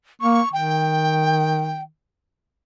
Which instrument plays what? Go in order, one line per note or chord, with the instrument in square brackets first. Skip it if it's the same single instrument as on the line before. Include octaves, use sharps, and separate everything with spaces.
[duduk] A#3 [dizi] C#6
[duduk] D#3 [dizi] G5